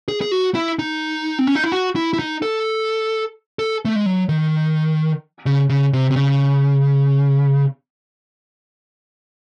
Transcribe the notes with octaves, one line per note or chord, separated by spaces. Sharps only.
G#4
G#4
F#4
E4
D#4
C4
C#4
D#4
E4
F#4
E4
E4
D#4
A4
A4
A3
G#3
F#3
D#3
C#3
C#3
C3
C3
C#3